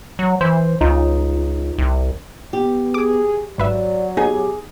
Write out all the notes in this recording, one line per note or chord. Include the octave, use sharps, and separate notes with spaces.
F#3
E3 C5
C#2 D#4 F4
C2
B3 G4
G#4 D6
G#1 F#3 B4 D5 E5
B3 D#4 G4 G#4 G#5